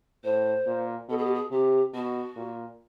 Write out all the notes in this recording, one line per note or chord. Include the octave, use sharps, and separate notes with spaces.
A2 C5
A#2
B2 A4
G#4
G4
G#4
C3 G4
B2 F#4
A#2